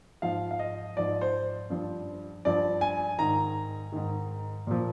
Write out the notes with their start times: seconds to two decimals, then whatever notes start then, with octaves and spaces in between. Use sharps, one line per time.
0.22 G#2 F3 F5
0.51 F5
0.59 D#5
0.97 G#2 F3 D5
1.21 C5
1.70 G2 F3
2.45 G2 F3 D5
2.81 G#5
3.19 G#2 D#3 A#5
3.92 G#2 D#3
4.67 A#2 F3